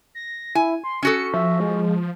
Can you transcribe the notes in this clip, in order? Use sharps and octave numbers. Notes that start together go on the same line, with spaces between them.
A#6
E4 G#5
C6
C#4 F#4 A4 C#7
F3 E5
G#3